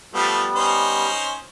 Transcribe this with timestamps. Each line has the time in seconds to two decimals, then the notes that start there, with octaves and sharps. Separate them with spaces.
0.14 F3 G3 A3 B3
0.55 C#4 D#4 C5